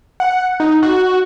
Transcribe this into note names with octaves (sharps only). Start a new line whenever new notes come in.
F#5
D#4
F#4